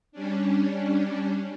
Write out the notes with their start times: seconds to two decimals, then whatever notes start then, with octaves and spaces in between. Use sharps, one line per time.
0.12 G3 C#4 D4